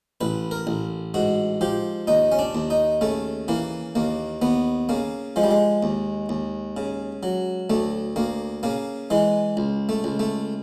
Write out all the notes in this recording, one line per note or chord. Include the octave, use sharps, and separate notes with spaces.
A1 B4
A#4
A1
G#2 F#4
F3 G4
D#2 D#4
C#4
D4
D#2
D#4
C#3 A3
E3 A#3
D#2 A#3
D#2 B3
C#3 A#3
F3 G#3
G3
G#3
D#2
D#2
C#3
F#3
D2 A3
D2 A#3
C#3 A#3
E3 G#3
C#2
A3
C#2
A3